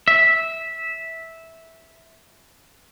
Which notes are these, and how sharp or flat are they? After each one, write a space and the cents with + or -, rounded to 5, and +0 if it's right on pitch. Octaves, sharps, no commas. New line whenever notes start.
E5 -10